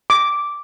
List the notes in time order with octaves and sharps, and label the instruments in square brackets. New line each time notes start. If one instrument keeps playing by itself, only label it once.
[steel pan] D6